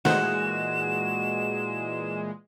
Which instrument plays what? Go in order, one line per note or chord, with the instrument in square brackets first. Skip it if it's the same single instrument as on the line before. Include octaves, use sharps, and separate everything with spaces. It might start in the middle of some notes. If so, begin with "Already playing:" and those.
[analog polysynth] A#2 E3 G#3 [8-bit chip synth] D#3 A3 C5 [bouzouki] F#4 [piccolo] E7